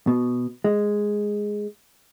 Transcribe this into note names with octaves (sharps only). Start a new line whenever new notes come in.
B2
G#3